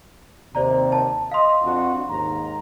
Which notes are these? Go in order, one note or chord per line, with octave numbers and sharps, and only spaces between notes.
D#2 C3 C5 D5 A#5
A5
D#5 F5 C6
F2 D4 F#4
D#2 G#2 A#5